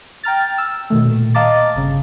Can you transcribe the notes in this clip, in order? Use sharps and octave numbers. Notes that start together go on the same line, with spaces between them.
G5 A#5 F6 A6
E6
B2 D#3 A3
A#2
D#5 F5 A5 A#5 D6 A6
G1 C#3